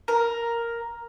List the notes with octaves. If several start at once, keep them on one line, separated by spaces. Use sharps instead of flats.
A#4